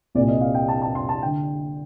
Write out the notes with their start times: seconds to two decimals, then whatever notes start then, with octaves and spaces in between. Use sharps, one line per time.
0.15 C2 D5
0.18 A#2
0.28 D#5
0.41 F5
0.55 G5
0.68 A5
0.82 A5
0.95 C6
1.09 A5
1.22 D3 G5